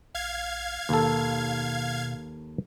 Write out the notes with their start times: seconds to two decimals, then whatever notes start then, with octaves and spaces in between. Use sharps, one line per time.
0.15 A#1 F5 G#6
0.89 D#2 B2 A4